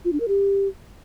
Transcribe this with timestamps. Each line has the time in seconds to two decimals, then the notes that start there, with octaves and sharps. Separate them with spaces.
0.05 F4
0.13 D4
0.20 A#4
0.28 G4